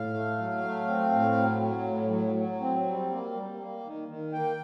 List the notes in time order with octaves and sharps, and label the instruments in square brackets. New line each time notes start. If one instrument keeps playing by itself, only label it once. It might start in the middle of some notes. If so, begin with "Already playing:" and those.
Already playing: [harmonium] A2 F5
A3
F#3
A3
C4
A2
F#3
F#3
A2
F#3
F#3
C4
G3
A#3
G3
A#3
D#3
D#3
A#3 G5